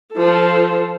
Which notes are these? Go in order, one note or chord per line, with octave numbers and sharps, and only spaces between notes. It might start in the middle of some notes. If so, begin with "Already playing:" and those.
F3 A4